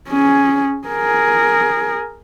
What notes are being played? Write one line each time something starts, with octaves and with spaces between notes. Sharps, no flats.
C#4 G#4
G#4 A#4